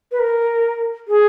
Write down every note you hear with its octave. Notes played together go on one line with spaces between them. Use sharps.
B4
A#4
G#4